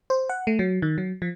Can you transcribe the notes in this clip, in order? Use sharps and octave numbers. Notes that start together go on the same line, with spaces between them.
C5
F#5
A3
F#3
D#3
F#3
F3